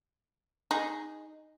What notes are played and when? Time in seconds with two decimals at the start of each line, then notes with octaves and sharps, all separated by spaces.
0.71 D#4 G#4